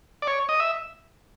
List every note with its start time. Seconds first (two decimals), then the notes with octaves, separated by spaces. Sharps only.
0.22 D5
0.27 C#5
0.49 D#5
0.60 E5